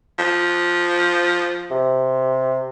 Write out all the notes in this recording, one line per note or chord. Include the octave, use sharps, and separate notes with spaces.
F3
C3